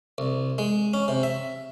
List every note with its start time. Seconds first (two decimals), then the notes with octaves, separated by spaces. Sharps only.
0.18 C2
0.58 G#3
0.94 C#4
1.08 C3
1.23 E5